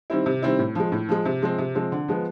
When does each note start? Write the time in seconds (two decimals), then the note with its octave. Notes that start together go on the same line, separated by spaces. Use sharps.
0.10 D#3 G3 C4 E4
0.26 C3
0.42 D#3 G3 C4 E4
0.59 A2
0.75 F3 G#3
0.92 A2
1.09 F3 G#3
1.25 C3
1.42 F3 G#3 C4
1.58 C3
1.75 F3 G#3 C4
1.92 D3
2.08 F3 G#3 B3